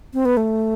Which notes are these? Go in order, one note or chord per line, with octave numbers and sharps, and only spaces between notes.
C4
B3
A3